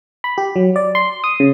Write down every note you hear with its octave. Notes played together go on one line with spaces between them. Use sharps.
B5
G4
F#3
D5
C6
D#6
C#3